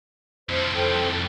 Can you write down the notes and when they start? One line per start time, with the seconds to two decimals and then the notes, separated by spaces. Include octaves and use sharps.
0.49 F2 A2 C5
0.75 A4 C5 G5